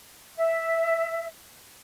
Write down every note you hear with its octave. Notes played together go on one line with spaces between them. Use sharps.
E5